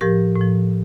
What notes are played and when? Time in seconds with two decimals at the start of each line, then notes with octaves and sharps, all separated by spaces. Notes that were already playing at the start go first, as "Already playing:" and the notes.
0.01 A2 F3 G4 A#4
0.36 A2 F3